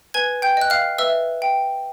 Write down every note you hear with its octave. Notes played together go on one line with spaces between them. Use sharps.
B4 G#5 G#6
G5 G6
D#5 F#6
F5 F6
B4 E5 E6
G5